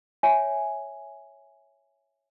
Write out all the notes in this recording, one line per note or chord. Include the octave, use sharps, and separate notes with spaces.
C#5 E5 G#5